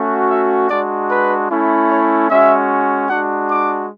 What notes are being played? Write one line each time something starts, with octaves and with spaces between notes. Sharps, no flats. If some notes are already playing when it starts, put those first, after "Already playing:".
Already playing: A3 C#4 F#4
E5
G#3 D4 F#4 D5
B4
A3 C#4 E4
C#5
G#3 C#4 F#4 E5
G#3 D4 F#4 F#5
D6